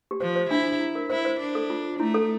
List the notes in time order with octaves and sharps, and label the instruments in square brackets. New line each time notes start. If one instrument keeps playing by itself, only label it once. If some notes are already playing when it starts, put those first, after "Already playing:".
[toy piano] G4
[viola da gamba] F3 [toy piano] C5
[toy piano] C5
[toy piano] D4 [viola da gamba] E4
[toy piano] E4
A#4
[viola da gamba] E4 [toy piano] C5
[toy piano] C5
[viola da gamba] D4
[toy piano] A4
F4
[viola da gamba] A3 [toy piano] E4
[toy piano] A4